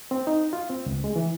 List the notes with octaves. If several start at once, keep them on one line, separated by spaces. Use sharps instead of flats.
C4
D#4
F4
C4
C#2
G#3
E3